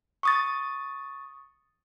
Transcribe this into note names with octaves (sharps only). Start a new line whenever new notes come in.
C#6 D#6 A6